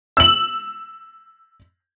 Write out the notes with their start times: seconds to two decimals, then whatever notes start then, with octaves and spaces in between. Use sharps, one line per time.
0.17 E6 F#7